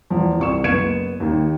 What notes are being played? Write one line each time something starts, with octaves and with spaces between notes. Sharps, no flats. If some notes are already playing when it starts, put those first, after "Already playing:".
E2 F3
C2 C#6 E7
F#1 B3 G#6 C#7 D#7 E7
D#2 D#3